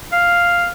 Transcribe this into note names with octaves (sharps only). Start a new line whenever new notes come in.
F5